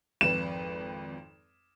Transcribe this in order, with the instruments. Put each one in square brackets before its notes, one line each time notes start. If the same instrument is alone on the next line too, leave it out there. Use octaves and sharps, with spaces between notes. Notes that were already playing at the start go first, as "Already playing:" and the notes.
[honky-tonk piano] G#1 F2 B4 [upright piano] E7